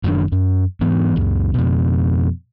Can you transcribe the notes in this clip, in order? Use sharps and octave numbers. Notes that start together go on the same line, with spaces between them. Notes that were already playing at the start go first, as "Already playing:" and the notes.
F#1 F#2 D#3 D4
F#2
G#2 E3 B3
C#2 F#2
F2 B2